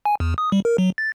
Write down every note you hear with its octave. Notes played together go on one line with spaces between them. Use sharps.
G#5
E2
D#6
G3
A#4
F#3
A6